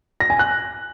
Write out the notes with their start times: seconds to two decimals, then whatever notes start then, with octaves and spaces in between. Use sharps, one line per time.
0.20 A#6
0.30 G#5
0.39 F#6